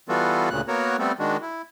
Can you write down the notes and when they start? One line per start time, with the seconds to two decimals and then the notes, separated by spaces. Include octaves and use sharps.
0.09 E3 G3 B3 F4 F#4 A4
0.50 D2 A#2 C#3 F#6
0.68 A#3 B3 F#4 A#4 C#5
0.99 G3 A3 B3 C4 A4
1.19 D#3 G#3 D4 F#4
1.42 E4